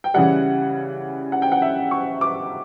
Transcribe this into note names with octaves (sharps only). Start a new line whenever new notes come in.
G5
C#3 E3 G3 F#5
F#5
G5
F#5
E5
C#6
D6